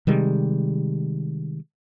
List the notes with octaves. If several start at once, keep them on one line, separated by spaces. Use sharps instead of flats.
C3 D#3 G3 G#3